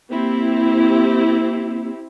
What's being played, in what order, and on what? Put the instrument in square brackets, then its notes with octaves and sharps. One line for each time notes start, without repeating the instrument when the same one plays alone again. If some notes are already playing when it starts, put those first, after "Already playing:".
[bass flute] A#3 [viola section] C4 E4 G4